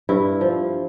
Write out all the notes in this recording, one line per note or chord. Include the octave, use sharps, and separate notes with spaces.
G2 E4
F3